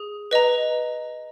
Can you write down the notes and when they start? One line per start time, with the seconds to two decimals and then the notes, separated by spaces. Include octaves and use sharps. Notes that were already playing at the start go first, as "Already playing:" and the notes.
Already playing: G#4
0.31 B4 D#5 A#5